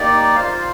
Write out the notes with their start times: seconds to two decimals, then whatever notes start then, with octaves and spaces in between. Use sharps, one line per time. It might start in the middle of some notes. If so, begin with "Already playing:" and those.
Already playing: A#3 D#4 G4 D5
0.36 F4 C5 F5